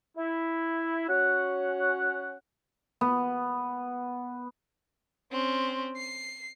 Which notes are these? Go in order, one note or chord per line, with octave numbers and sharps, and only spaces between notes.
E4
C#4 F#4 C#5 F#5
B3
C4 C#4
C7